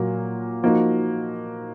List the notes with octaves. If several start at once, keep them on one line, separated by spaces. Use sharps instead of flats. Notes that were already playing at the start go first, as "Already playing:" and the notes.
Already playing: A#2 F#3 A#3
F3 A#3 D#4 F#4